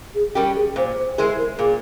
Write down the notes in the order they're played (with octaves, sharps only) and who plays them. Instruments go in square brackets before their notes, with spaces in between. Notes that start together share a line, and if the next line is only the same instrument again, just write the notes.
[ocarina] G#4
[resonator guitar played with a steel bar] G3 C#4 G4 [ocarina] A#4
[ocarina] G#4
[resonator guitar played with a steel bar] A#2 [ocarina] C5
[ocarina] C5
[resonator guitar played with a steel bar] G#3 E4 G#4 C5 [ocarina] A#4
[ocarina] A#4
[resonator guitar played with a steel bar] A#2 [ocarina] G#4